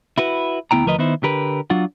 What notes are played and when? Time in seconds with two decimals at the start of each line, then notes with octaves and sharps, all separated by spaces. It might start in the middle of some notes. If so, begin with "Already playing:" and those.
0.18 E4 F#4 B4
0.71 D2 B3 E4 G5 A#5
0.86 D2 F3 A#4 B4 D5 D#5
0.98 D#3 B3 D#4 E4 C5
1.23 D3 G4 A#4 B4
1.70 F#3 D4 F4 F#5